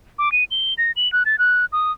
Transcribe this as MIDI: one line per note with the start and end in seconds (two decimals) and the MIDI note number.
0.19 0.32 86
0.32 0.44 99
0.51 0.74 103
0.78 0.92 94
0.96 1.11 102
1.13 1.23 90
1.26 1.38 93
1.39 1.65 90
1.72 1.92 87